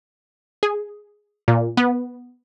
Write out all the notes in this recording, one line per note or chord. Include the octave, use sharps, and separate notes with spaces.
G#4
A#2
B3